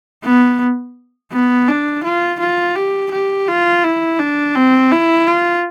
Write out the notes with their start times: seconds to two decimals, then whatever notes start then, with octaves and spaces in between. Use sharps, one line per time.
0.24 B3
1.32 B3
1.68 D4
2.04 F4
2.40 F4
2.76 G4
3.12 G4
3.47 F4
3.83 E4
4.19 D4
4.55 C4
4.92 E4
5.27 F4